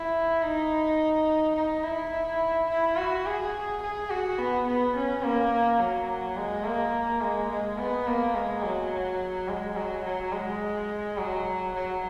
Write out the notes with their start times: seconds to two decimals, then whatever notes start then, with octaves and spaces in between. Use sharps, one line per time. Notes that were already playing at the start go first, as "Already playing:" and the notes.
Already playing: E4
0.43 D#4
1.55 D#4
1.83 E4
2.69 E4
2.97 F#4
3.26 G#4
3.82 G#4
4.10 F#4
4.39 B3
4.67 B3
4.96 C#4
5.23 A#3
5.80 F#3
6.37 G#3
6.65 A#3
7.21 G#3
7.50 G#3
7.78 B3
8.07 A#3
8.35 G#3
8.62 F#3
9.48 G#3
9.76 F#3
10.04 F#3
10.32 G#3
11.17 F#3
11.74 F#3